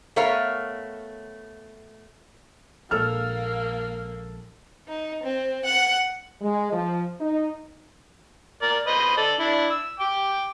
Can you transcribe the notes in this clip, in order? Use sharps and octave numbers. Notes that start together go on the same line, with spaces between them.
A3 B3 A#4 C#5 F5
A#1 G#3 A#3 A4 E6 F6
D#4
C4
F#5
G#3
F3
D#4
A#4 D5
B4 C5 D#5
A4 D5
D4 E4
E6
G5 D6